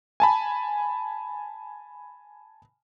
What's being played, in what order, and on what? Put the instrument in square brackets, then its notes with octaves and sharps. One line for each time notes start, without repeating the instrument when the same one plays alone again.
[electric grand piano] G#5 A5 B5